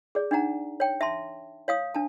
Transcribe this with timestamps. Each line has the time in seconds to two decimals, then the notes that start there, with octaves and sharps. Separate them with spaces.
0.15 G#4 D5
0.31 D4 D#4 F#5 A#5
0.80 C#5 G5
1.01 E5 A5 C6
1.68 C#5 F5 D#6
1.94 D4 A5